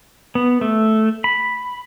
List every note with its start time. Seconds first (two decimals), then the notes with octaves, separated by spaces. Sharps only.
0.35 B3
0.61 A3
1.24 B5